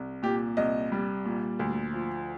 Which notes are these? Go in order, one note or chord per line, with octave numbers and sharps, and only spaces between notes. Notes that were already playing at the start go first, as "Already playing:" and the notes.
Already playing: C2
A#2 G4
C2 D#5
G3
A#2
D2
F3